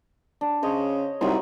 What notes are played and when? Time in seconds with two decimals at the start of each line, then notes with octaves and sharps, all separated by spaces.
0.41 D4
0.63 C#3 C5 C#5 D#5
1.21 C2 F#3 D#4 C5